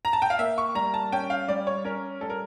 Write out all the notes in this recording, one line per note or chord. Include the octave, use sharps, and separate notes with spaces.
A#5
A5
G5
F5
A#3 E5
C#6
G3 A#5
A5
C#4 G5
F5
G3 D5
C#5
C#4 A#4
G3 A4
A#4